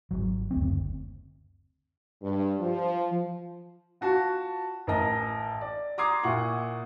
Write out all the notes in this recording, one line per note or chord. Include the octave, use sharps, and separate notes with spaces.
G#1 C#2 F#3
F#1 D2 C4
G2
F3
F4 F#4 A5 C#6
A1 A#4 D#5 A5 A#6
D5
A#5 C6 D6 D#6 G#6 C7
A#2 E4 F#5 C#6